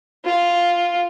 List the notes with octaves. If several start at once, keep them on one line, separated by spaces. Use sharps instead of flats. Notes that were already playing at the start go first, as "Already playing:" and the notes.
F4